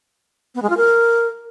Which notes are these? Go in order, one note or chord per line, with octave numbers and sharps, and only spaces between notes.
B3
G#3
F4
A#4